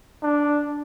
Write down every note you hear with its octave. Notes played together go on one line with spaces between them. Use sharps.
D4